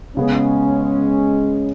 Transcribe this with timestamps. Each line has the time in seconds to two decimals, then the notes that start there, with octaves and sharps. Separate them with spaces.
0.16 C#3 G#3 B3 C#4 G#4